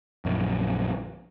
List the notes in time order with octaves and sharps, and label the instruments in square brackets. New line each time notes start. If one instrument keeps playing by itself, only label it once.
[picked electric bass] A#1 F#2